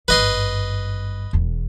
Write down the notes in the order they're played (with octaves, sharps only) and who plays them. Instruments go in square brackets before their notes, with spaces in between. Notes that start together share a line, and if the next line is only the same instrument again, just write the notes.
[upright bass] G#1 G2 [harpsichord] B4 D#5 C6
[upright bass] E1 E2